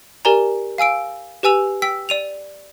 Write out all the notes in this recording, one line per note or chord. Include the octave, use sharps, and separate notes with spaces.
G4 A#4 D5 G#5 A#5
F5 G#5 E6 D7
G4 B4 G#5 E6 F7
G5 E6 B6
D5 D#7 F7